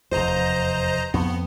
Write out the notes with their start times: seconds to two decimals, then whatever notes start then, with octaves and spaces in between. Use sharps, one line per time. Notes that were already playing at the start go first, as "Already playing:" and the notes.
0.12 F1 E2 C5 D#5 A#5
1.14 F2 B3 C4